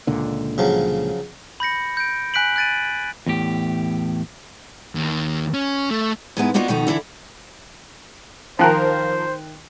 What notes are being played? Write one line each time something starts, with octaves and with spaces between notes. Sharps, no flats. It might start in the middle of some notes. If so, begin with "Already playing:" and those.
C#2 A#2 D3
C#3 F3 F#3
B5 G6 A#6 C#7
G6 D7
G#5 F#6 B6 D7 F#7
F#6 G#6 A6 D7 D#7
E2 A2 G4
D#2
C#4
A3
G#2 G#3 B3 E4
A#3 B3 D4 D#4 F4 F#4
B2 D#3 F3 B3 D#4 A4
D3 E3 E4 A4
D#3 F3 A#4 C5 G5 F#6